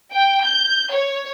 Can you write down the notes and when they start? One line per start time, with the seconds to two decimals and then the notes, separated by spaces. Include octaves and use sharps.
0.13 G5
0.46 G6
0.92 C#5